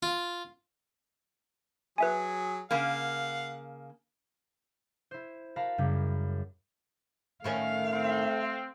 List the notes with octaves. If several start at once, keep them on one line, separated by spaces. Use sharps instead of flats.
F4
F#3 G#4 B4 E5 G#5
C#3 A#3 F5 F#5
E4 C5
F#4 A#4 F5 A5 B5
F#2 C#3 G3 E4
A2 D#3 A3 C#4 F5
C4